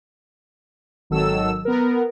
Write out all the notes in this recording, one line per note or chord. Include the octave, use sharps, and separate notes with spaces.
G#1 D#3 F#3 A4 E6
B3 A#4